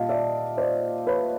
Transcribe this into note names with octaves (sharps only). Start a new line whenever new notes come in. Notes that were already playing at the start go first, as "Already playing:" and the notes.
Already playing: A#2 G3 D#5 F5 A5
D5 E5
C5 D5
B4 C#5